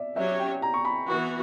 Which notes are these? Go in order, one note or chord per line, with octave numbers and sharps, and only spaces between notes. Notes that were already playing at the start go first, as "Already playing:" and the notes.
Already playing: D5 E5
F#3 C#4 G4 C#5 E5
G5
A#5
C#6
B5
E3 B3 F#4 C#6